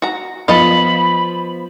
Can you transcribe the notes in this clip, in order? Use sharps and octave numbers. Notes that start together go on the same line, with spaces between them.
F#4 A#5
F3 B3 A4 D#5 F5 B5